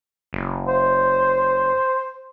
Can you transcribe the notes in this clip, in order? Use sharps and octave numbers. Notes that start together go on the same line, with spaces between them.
F#1
C5